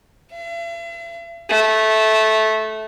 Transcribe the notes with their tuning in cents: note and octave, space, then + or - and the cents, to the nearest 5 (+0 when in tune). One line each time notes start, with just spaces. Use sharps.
E5 +45
A3 -15